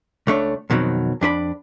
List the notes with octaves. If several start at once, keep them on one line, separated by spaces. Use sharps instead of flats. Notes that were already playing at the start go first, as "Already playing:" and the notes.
C#2 A3 D4 C#5
F2 B2 D#3 F#3 C4
F2 D4 B4 B5